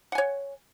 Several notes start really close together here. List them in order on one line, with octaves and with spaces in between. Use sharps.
F#5 G#5 C#5